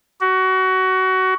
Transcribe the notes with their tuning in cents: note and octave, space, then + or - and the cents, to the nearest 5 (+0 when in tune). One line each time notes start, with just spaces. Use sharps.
F#4 +25